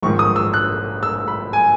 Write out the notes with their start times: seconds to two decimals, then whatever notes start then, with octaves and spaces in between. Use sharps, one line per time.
0.03 A#1 G#2 D#3 C#6
0.19 D#6
0.36 E6
0.54 F#6
1.03 E6
1.28 B5
1.53 G#5